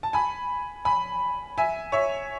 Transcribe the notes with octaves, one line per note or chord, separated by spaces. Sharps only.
A5
G#5 B5
G#5 B5
E5 G#5
C#5 E5